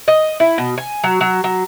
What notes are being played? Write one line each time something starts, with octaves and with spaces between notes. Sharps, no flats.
D#5
E4
B2
G#5
F#3
F#3
F#3